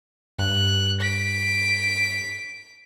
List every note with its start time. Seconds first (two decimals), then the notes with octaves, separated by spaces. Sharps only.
0.39 G2 F#6
1.01 B6 D7